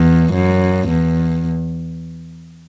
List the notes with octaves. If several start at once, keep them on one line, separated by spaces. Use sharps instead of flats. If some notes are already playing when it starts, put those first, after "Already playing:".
Already playing: E2
F#2
E2